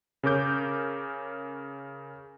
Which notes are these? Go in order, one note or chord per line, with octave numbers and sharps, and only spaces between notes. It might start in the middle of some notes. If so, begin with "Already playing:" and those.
C#3 C#4 A#4 D6 G6